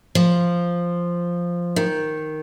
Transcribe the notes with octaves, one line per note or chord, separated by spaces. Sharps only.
F3
D#3